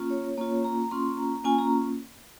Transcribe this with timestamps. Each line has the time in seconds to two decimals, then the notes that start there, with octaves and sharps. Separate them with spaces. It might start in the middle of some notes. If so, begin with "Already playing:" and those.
Already playing: A#3 C#4 F4
0.10 C#5
0.37 A#3 C#4 F4 C#5
0.64 A#5
0.91 A#3 C#4 F4 C6
1.17 A#5
1.45 A#3 C#4 F4 G#5
1.59 A#5